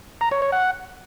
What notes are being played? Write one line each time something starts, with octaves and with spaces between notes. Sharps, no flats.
A#5
C#5
C#5
F#5